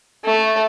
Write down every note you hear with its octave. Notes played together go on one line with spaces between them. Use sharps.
A3